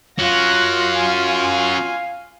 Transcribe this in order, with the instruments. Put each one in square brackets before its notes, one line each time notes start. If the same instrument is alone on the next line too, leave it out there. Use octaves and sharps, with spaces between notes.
[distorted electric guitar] C#4 F#4 [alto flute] F4 [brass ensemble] F5 [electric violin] F#6 A#6
[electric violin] G#5